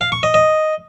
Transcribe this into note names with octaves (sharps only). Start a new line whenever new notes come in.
F5
C#6
D#5
D#5